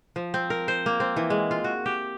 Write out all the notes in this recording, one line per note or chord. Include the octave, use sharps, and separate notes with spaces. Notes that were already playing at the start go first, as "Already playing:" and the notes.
F3
C4
A#4
C5
A#3
C4
E3
G#3
F4
F#4
G4